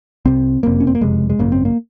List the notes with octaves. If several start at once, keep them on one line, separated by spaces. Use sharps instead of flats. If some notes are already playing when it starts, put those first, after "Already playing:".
C2 C3 C4
F#1 F2 C3 A#3
C#4
C4
A#3
F#1 F2 C3 G#3
G#3
G#1 F#2 C#3 A#3
C4
A#3